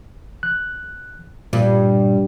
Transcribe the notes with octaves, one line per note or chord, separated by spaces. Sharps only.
F#6
G2 A#2